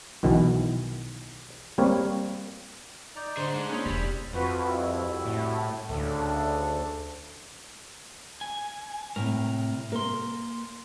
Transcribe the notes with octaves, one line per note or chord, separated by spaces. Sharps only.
B1 B2 D#3 E3
G3 A#3 C4 A#4 C#5
D#4 D5 A#5
D3 G#4 C5
G#3 D4 G#5
A#3 C#4 D4 E4 G#4 C5
E1 G3
F2 F4 F#4 B4
C2 E4 F#4
A2
D2 C#3 D4 A4
G#5
A2 C3 A#4
A#3 A#4 C6